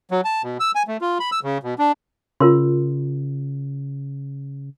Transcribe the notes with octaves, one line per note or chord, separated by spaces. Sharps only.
F#3
A5
B2
E6
G#5
A3
F4
B5
E6
C#3
B2
D4
C#3 F4 A#4 C6